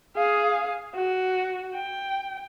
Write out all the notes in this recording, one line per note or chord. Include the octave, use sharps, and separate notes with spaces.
G#4 F5
F#4
G5